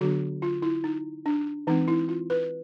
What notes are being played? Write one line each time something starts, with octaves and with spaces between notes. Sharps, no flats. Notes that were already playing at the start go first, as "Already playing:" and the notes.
D3 F#3 B3 D4 F#4
F4
E4
D#4
D4
E3 G#3 C4 D#4
E4
F4
B4